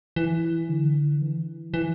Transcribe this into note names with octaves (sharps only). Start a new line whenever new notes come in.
E3
D3
E3
E3